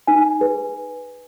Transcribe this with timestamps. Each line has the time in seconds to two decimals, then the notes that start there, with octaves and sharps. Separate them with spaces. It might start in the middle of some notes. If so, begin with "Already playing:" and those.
0.07 D#4 G#5
0.41 G#4 B4